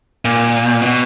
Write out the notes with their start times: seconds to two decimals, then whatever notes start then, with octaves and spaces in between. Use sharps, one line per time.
0.25 A#2
0.82 B2